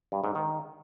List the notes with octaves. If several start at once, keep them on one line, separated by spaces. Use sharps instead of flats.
G2
G#2
D#3